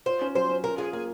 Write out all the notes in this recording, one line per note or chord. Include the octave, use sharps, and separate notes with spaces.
F4 C5
C#4
F#3 C5
C#4
F4 A#4
F4 G#4
A#3 G#4